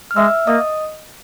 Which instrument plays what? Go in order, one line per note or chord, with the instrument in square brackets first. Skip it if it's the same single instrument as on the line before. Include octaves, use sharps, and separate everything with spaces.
[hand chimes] F6
[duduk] G#3 [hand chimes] E5 E6
[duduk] A#3 [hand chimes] D#5 D#6